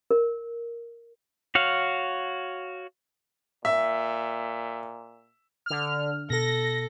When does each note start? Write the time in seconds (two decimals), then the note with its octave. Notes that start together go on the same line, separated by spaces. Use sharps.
0.11 A#4
1.55 F#4 C#5 F5
3.65 A#2 E5
5.66 D3 F6
6.30 B2 A4 A#6